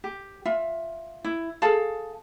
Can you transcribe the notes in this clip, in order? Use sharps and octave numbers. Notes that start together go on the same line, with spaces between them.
G4
F4 E5
E4
G#4 A4 F5 A5